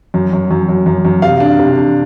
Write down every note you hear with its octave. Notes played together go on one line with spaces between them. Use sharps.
F#2
F#2
F#2
F#2
F#2
F#2
C3 F5
D4
C3
D4